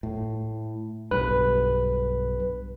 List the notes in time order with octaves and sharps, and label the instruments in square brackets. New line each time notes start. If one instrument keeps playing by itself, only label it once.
[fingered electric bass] A2
[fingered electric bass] B1 G2 [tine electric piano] B4